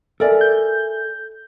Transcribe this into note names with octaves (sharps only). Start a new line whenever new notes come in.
A4 A#4 D5 E5 G#5
G6